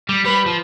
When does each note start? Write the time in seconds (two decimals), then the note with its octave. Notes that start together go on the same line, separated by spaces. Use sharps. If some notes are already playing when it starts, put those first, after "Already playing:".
0.09 G3
0.25 G3 B4
0.46 F3